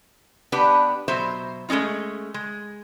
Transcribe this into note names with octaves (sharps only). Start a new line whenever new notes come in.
B3 D4 G4 B4
B2 F#3 C5 E5
G#3 A3 C#4 D#4 F4
G#3